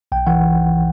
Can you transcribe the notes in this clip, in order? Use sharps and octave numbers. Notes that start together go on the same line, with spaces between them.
B1 G5
E3 F#5